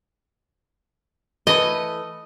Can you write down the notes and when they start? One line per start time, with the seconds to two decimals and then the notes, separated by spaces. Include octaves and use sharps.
1.47 E3 A3 B4 D#5